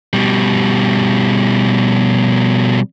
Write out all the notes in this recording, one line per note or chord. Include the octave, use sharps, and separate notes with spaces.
B2 G3